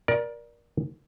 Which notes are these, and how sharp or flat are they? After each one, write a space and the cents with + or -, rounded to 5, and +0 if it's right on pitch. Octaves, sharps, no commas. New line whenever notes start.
A#4 +25 D5 +0